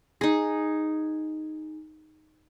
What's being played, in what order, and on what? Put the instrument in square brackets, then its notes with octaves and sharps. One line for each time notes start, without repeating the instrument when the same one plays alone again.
[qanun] D#4 G#4